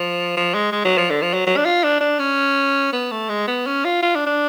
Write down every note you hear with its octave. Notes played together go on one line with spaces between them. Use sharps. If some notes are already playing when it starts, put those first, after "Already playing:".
Already playing: F3
F3
G#3
G#3
F#3
F3
D3
F3
F#3
F#3
D4
F4
D4
D4
C#4
B3
A3
G#3
B3
C#4
F4
F4
D4
D4